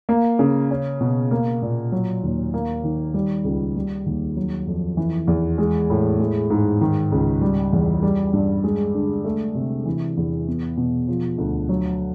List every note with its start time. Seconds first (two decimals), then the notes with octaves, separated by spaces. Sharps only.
0.09 A#3
0.39 C#3
0.71 C#4
1.01 B2
1.31 A#3
1.62 A#2
1.92 F#3
2.23 D#2
2.54 A#3
2.84 D#3
3.14 G3
3.44 C#2
3.76 G3
4.06 D#2
4.37 F#3
4.67 F2
4.97 E3
5.28 E2
5.58 G#3
5.90 A2
6.20 G#3
6.50 G#2
6.81 D#3
7.12 C#2
7.41 G3
7.73 E2
8.03 G3
8.33 G2
8.64 G#3
8.94 D3
9.25 A3
9.55 C3
9.86 E3
10.17 E2
10.48 B3
10.77 B2
11.08 F3
11.38 D2
11.69 F#3